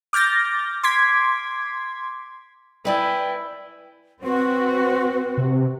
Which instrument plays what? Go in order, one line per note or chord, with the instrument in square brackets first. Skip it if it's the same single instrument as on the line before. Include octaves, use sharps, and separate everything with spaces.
[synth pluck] D6 F6 G6 A6 A#6
C6 D6 G#6 B6
[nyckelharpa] E4 [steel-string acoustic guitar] B4 D5 G#5 [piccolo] G5
[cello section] C4 F#4 [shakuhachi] B4
[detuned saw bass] C3